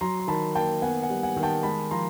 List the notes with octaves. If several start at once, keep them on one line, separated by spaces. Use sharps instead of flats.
F#3 A#5 C6
C6
D#3 A5 B5
A#3 G5 A5
B3 F#5 G#5
F#5 G#5
G3
F#5 G#5
D#3
G5 A5
G#3 A5 B5
F3 A#5 C6